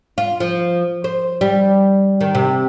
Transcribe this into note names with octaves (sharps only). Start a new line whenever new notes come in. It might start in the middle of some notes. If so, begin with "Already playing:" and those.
F4
F3
C5
G3
D#3
C3